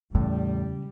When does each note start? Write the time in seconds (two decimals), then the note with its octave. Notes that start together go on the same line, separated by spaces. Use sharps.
0.15 E2 A2 C#3 G3